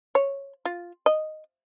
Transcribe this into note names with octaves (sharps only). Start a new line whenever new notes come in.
C#5
F4
D#5